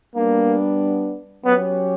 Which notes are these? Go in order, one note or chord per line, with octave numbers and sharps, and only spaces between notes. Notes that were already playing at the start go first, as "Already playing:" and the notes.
G3 A#3 B3 D4
F#3 B3 C#4 G4 C#5